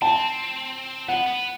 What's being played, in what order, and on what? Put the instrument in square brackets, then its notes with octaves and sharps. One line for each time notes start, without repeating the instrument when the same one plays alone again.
[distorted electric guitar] C4 [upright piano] A5
[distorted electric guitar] B3 [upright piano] F#5
[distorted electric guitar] B3